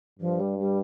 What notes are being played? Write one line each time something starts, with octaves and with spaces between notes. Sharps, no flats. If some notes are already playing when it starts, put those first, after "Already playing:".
G2 F3
G3
G3